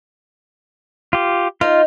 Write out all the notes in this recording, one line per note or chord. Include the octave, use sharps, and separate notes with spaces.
F4 G4
D#4 F4